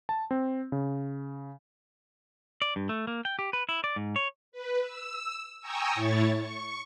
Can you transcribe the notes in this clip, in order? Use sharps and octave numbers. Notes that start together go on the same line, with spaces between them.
A5
C4
C#3
D5
G2
A3
A#3
G5
G4
B4
E4
D5
G#2
C#5
B4
E6
G5 G#5 A#5 C#6 D#6 E6
A2 E4 C#5 C#6 A6
C#6